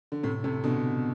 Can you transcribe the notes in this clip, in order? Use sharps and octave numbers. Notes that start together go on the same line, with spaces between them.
D3
A2 C3
A2 C3
B2 D3